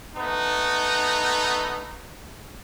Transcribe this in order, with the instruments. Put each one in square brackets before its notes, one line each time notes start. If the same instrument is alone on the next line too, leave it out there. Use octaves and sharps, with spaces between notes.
[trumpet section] A3 B3 D#4